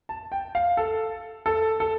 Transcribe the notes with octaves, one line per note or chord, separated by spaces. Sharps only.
A5
G5
F5
A4
A4
A4